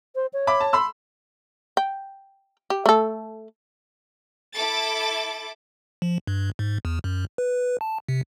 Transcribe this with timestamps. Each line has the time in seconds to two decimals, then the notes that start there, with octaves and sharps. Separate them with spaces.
0.15 C5
0.33 C#5
0.47 E5 B5 D6
0.60 A5
0.73 B5 C6 E6
1.77 G5
2.70 G4
2.86 A3 A4
4.53 E4 A4 A5 D6 A6
6.02 F3
6.27 G2
6.59 G#2
6.85 E2
7.04 F#2
7.38 B4
7.81 A5
8.08 C3